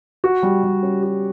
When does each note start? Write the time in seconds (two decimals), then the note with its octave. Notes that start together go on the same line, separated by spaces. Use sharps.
0.24 F#4
0.43 G3
0.64 G3
0.83 C#4
1.03 F#4